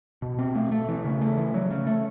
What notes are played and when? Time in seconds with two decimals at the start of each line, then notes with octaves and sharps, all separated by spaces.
0.22 B2
0.39 C4
0.55 A3
0.72 A3
0.88 E3
1.04 C#3
1.21 A3
1.38 E3
1.54 F#3
1.71 C#3
1.87 A3